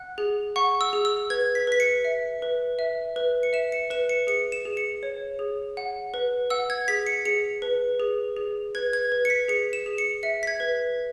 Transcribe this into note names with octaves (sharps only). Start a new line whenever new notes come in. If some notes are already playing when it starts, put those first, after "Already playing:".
Already playing: F#5 F#6
G#4
F#5 C#6
E6
G#4
E6
B4 G#6
B6
B4 B6
C#7
E5
B4
E5
B4
C#7
E5 E7
C#7
B4 E7
C#7
G#4 C#7
E7
G#4
C#7
C#5
G#4
F#5
B4
F#5 E6
G#6
G#4 B6
C#7
G#4 C#7
B4
G#4
G#4
B4 G#6
G#6
B4
C#7
B6
G#4 C#7
E7
G#4
C#7
E5 C#7
B6
G#6
B4